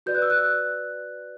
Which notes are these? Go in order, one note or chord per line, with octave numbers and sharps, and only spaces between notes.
F#4 B4 D5 G6
F#6
E6
F#6